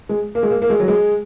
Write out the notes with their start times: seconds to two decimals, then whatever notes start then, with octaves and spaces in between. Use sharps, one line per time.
0.09 G#3
0.35 A#3
0.43 G#3
0.50 A#3
0.62 A#3
0.70 G#3
0.80 F#3
0.88 G#3